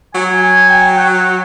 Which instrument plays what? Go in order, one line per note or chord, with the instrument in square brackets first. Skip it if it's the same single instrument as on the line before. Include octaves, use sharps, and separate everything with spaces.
[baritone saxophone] F#3 [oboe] G#5
[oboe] G#5
G5
F#5